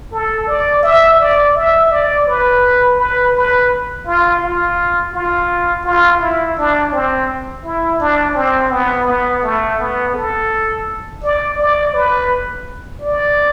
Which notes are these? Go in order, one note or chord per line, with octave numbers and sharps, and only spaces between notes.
A4
D5
E5
D5
E5
D5
B4
B4
B4
F4
F4
F4
F4
E4
D4
C4
E4
D4
C4
B3
B3
A3
B3
A4
D5
D5
B4
D5